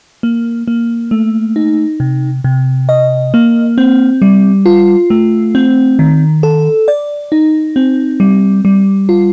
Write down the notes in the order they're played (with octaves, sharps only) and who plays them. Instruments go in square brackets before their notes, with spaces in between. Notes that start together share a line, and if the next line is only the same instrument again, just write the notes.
[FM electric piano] A#3
A#3
A3
D#4
C3
C3
D#5
A#3
C4
G3
F4
A3
C4
D#3
A4
D5
D#4
C4
G3
G3
F4